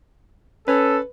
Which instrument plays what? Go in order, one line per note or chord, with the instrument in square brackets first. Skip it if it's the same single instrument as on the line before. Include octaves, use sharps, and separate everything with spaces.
[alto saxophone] C#4 [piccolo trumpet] A4 [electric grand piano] B4